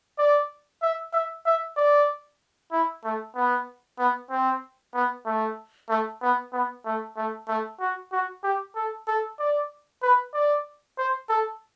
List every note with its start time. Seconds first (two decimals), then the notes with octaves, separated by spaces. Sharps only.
0.19 D5
0.82 E5
1.13 E5
1.46 E5
1.77 D5
2.72 E4
3.04 A3
3.36 B3
3.99 B3
4.31 C4
4.94 B3
5.26 A3
5.90 A3
6.22 B3
6.53 B3
6.85 A3
7.17 A3
7.48 A3
7.80 F#4
8.13 F#4
8.44 G4
8.76 A4
9.08 A4
9.39 D5
10.03 B4
10.34 D5
10.98 C5
11.29 A4